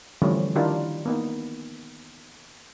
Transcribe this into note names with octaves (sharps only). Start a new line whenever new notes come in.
D3 E3 F3 G3 A3 C#4
D#3 D4 E4 F4 G4 A#4
A#3 B3 D#4